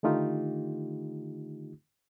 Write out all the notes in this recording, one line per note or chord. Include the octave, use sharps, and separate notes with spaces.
D3 D#3 A3 D#4 F4 G4